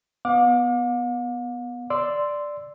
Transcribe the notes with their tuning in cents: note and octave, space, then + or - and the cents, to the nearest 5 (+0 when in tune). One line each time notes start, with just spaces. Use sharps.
B3 +0 F5 +45 D6 +0
D5 +0 C6 -10 E6 +0